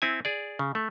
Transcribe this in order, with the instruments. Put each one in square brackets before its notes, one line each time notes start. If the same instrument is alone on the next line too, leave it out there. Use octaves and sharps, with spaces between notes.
[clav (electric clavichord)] C4 E4 G#5
G#4 D5
C#3
A3